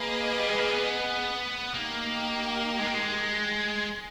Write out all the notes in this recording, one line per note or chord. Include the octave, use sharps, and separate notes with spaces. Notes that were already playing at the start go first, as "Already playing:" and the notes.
Already playing: A#3 G#4 B4 D#5
G3
G#3
A#3
B3
A#3 D#4 G4 A#4
G#3
A#3
G#3